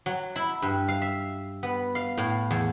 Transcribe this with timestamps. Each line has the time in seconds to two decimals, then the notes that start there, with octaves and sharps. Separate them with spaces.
0.06 F#3
0.36 E4
0.62 G2
0.88 F5
1.02 E5
1.63 B3
1.95 F5
2.18 A2
2.51 E2